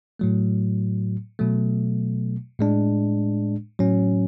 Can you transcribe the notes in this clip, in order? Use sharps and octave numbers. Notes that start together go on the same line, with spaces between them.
A2 F#3 A3
B2 F#3 A3
A2 G#3 D4
A2 F#3 C#4